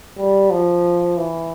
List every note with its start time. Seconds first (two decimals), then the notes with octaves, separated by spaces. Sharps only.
0.18 G3
0.50 F3
1.17 E3